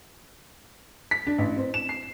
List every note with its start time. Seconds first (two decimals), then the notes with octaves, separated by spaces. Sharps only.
1.11 B6
1.27 D4
1.38 A1
1.57 C4
1.74 E7
1.89 C7